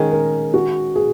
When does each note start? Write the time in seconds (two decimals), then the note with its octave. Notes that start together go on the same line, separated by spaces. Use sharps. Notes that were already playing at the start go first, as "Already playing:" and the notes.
Already playing: D#3 G#3 C#4 G#4 A#4
0.12 A#4
0.54 F#4
0.96 G#4